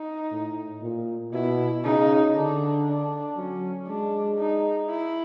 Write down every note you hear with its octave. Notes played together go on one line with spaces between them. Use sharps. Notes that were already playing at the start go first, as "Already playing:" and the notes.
Already playing: D#4
A2
A#2
B2 E4
C#3 D#4
D3 D4
D4
F#3 C#4
G#3 D4
D#4
E4